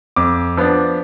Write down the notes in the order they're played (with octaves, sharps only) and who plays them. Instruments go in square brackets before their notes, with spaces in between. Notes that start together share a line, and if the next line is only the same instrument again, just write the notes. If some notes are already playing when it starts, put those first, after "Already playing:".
[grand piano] F2 D6
F3 B3 D4